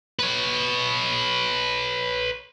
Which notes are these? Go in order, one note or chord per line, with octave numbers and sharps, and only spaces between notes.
B4 C#5